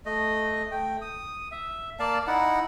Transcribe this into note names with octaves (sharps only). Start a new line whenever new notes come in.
A3 D#5
A3 G5
D#6
E5
A#3 D5 F5 A5
D#4 E4 F#5